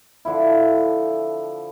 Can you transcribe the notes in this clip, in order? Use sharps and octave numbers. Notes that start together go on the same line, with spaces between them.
D3 F3 E4